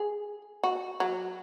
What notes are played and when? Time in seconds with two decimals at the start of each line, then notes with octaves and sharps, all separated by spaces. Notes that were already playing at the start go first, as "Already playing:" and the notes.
Already playing: G#4
0.63 F#4
1.00 F#3